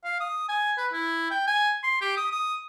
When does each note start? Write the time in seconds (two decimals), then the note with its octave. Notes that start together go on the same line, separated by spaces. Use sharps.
0.04 F5
0.20 D#6
0.49 G#5
0.77 B4
0.93 E4
1.31 G5
1.47 G#5
1.83 C6
2.01 G4
2.17 D#6
2.32 D#6